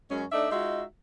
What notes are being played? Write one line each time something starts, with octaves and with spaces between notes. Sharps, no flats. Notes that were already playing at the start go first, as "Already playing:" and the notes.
F#2 F#3 G#3 C#4
A3 D4 D#4 D5 E5
G#3 D#4 F4 F#4 E5